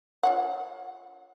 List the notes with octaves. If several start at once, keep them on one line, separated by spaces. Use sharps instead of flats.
F4 C#5 F#5